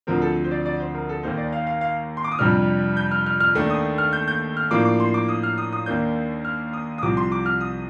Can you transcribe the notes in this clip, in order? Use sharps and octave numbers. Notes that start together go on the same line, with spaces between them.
D2 D3 F3 C4 A#4
A4
C5
D5
D5
C5
A#4
A4
D#2 D#3 A#3 D#4 C5
D5
F5
F5
F5
C6
D6
D#6
F2 C3 G3 D4 F6
G6
F6
F6
F6
D#2 D#3 A3 D4
D#6
F6
G6
G6
F6
A2 F3 A#3 D4 D6
D6
C6
D6
D#6
F6
D#6
D#6
D#2 D#3 A#3 D4 G6
F6
D#6
D#6
C2 C3 F3 D6
C6
D6
F6
D#6